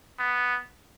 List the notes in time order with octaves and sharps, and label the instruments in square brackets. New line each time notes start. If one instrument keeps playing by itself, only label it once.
[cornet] B3